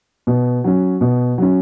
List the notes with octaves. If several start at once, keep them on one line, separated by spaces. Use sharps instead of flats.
B2
F#3 C#4
B2
F#3 C#4